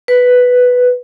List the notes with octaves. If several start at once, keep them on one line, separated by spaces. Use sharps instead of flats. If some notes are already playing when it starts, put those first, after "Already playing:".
B4